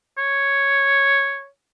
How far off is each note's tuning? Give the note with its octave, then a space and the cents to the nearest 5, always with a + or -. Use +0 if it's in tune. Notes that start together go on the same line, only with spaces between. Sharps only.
C#5 +0